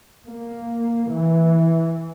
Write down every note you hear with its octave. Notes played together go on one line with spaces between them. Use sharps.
A#3
E3